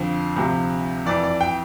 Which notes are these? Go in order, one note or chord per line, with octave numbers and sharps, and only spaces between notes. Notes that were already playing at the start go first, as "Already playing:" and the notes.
Already playing: F2 D3 F3 C5
D2 C3 F3
F2 E3 D5
D5
G5